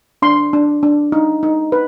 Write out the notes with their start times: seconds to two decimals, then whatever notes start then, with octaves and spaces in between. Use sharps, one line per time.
0.22 D4 C6
0.53 D4
0.83 D4
1.12 D#4
1.43 D#4
1.72 B4